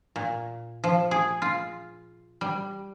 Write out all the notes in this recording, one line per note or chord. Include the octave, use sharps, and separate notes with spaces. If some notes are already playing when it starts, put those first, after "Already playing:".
A#2
F3
G#4
F4
G3